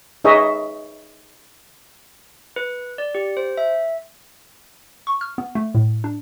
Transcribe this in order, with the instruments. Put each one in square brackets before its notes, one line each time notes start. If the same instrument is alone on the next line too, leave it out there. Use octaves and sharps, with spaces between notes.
[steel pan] D#4 G#4 B4 C#5 D#5 E5
[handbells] B4
D5
G4
C5
E5
[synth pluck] C#6
F6
B3
A3
A2
D4